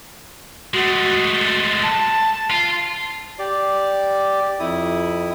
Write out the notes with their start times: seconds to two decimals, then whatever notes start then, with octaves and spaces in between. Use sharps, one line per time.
0.74 G#3 A3 F#4
1.83 A5
2.51 F4
3.39 G4 D5
4.60 F2 E4 D#6